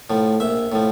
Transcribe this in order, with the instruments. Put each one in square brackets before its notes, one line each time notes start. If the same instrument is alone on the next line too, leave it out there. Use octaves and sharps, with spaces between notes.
[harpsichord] A2 F3
A#1 E5
A2 F3